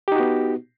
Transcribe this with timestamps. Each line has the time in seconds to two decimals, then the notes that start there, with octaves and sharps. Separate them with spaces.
0.08 G4
0.12 D#4
0.16 F#4
0.20 B3